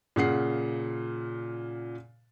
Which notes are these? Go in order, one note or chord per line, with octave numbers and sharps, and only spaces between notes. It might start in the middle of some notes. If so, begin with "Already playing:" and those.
A#2 C#3 F#5 C7